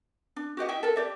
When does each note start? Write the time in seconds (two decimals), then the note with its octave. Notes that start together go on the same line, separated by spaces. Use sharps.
0.36 D4
0.57 F#4 G4 D#5 F#5
0.68 E4 D#5 E5 G5
0.83 A4 A#4
0.96 G4 D5 E5